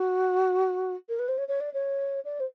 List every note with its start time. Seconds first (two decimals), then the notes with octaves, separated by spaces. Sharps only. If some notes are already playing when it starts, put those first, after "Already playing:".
Already playing: F#4
1.08 A#4
1.19 B4
1.28 C5
1.37 C#5
1.48 C#5
1.60 D5
1.73 C#5
2.24 D5
2.39 C5